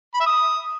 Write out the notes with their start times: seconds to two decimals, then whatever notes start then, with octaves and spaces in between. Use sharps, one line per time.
0.14 B5
0.20 E5
0.26 D#6